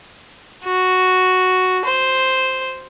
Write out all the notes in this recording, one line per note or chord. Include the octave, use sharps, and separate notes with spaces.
F#4
C5